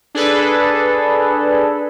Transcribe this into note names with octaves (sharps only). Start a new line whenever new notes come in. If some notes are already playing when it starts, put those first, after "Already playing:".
D4 G#4 A4 B4